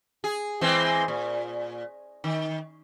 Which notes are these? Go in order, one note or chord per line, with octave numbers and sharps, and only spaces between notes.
G#4
E3 G#3 C4
A#2
D#3